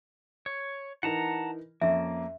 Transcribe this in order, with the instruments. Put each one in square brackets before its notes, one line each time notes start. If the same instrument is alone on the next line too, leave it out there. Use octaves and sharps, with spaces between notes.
[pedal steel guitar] C#5
[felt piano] E3 D#4 A#4 [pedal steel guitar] F#5 A5 A#5
[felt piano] F2 C#4 [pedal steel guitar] A#3 [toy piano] E5